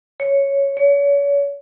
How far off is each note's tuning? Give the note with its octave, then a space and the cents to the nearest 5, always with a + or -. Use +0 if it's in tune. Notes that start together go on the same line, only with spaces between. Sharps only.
C#5 +0
C#5 +35